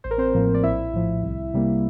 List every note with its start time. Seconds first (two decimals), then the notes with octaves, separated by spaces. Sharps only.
0.04 A1 C5
0.11 A#4
0.18 C4 C5
0.34 A2 F3 A#3
0.54 D5
0.63 A#1 E4 E5
0.94 A2 F3
1.23 C2
1.54 C3 G3 A#3